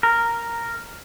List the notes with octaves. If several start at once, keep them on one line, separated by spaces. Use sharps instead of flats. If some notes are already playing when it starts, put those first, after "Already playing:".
A#4